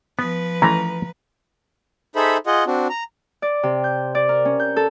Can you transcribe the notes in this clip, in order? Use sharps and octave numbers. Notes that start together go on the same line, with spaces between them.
F3 B3 B4
E3 A3 C#4 A#5
D#4 G#4 A4 C5 E5 B5
F4 G#4 D#5 F#5
C4 D4 F#4
A#5
D5
C3
G6
D5
A#4
C#4
G6
A4